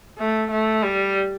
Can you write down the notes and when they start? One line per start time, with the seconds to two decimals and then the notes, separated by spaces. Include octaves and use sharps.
0.18 A3
0.51 A3
0.83 G3